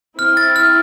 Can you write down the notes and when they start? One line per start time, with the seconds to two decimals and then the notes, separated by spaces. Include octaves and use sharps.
0.18 C4 E4 F6
0.37 A6
0.56 F6